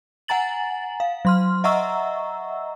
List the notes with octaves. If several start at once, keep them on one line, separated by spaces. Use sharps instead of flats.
F#5 G#5 A#5 A6 F#7
F5
F#3 C6 F6
D#5 E5 F#5 A#5 C#6 E6